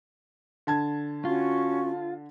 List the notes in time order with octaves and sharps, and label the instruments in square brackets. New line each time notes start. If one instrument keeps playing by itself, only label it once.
[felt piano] D3 A5 G#6
[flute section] C#4 F#4 C#6 [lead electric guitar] F4